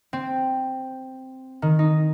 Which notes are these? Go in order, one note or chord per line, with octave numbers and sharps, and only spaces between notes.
C4
D#3
D#4